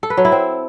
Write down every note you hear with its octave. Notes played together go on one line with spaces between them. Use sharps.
A4
B4
F#3
E4
C4